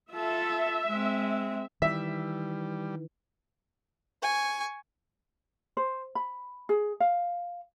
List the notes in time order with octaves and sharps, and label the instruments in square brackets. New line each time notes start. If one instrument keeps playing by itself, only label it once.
[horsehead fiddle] F4 A4 [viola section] E5
[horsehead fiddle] G#3 C4
[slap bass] D#3 E3 [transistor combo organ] G3 [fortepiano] E5
[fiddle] G#5 C#6
[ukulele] C5
B5
G#4
F5